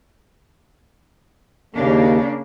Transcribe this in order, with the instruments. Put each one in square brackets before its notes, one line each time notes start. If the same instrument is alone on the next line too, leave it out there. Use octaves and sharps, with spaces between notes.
[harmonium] D#2 [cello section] C#3 A#3 D4